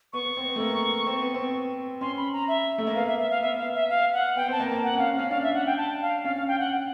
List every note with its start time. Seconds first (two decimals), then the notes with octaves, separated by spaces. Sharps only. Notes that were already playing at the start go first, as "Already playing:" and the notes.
0.13 B3 C#6
0.25 B3
0.37 C4
0.48 B3
0.56 A3
0.60 A#3
1.07 C4
1.21 B3
1.34 C4
2.01 C#4 C6
2.17 B5
2.33 A#5
2.48 E5
2.78 A3
2.87 A#3
2.95 B3 F5
3.07 E5
3.19 E5
3.30 F5
3.42 B3 E5
3.58 F5
3.74 E5
3.89 F5
4.13 F#5
4.36 B3 G5
4.48 C4 A5
4.60 A#3
4.71 A#3
4.84 F#5
4.95 C#4 F5
5.15 C#4 F5
5.30 D4 F5
5.43 E5
5.54 F#5
5.66 G5
5.78 A5
6.01 F5
6.24 C#4 F5
6.36 F5
6.48 G5
6.59 F#5